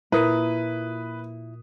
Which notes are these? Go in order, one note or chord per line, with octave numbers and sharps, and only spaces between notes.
A#2 E4 A#4 B4 D#6